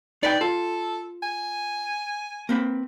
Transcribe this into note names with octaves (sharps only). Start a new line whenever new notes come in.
D#4 B4 D5 G5
F4 A4
G#5
A#3 C4 B4